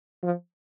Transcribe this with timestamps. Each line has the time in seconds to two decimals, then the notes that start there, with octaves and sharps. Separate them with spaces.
0.24 F3